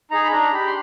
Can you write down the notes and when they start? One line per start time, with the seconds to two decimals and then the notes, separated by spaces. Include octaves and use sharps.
0.11 D#4 G#4 A#5
0.24 B5
0.32 D4 A#5
0.53 G4 B5
0.67 C6